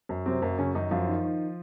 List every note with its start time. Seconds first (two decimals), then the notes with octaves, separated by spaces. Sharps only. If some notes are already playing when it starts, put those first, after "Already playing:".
0.09 F#2
0.26 C3 F#3 C4
0.42 F#2 A#3
0.59 F#2 C#3 C#4
0.75 F#2 D#3 D#4
0.91 F#2 F3 F4
1.07 D#3
1.24 D#3